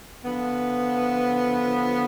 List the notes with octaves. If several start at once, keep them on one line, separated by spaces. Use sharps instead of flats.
D3 F3 B3